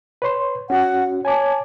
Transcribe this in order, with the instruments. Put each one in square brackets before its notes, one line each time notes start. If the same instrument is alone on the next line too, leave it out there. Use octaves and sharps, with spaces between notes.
[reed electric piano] B4 C#5 C6
[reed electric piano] C#4 F#4 [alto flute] F#5
[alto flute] C#5 [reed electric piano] G#5 A5 D6